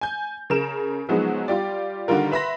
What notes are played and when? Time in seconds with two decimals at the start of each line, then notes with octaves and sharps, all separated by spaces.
0.01 G#5 G6
0.50 C#3 A#4 E7
1.09 F3 F#3 G#3 B3 D#4
1.48 G3 F4 G4 D5
2.08 D3 D#3 G3 F4 A#4
2.31 B4 E5 B5 C6 A#6